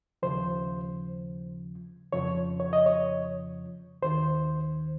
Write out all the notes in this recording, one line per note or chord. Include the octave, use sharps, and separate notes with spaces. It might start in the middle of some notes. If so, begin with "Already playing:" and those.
D#2 C#3 F3 C5
F2 C#3 F3 C#5
C#5
D#5
C#5
D#2 D#3 C5